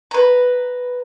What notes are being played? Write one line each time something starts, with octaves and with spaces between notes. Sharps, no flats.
B4 A#5